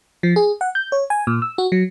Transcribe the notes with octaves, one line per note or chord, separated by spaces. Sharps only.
F3
G#4
F#5
G6
C#5
G#5
A#2
E6
F#4
F#3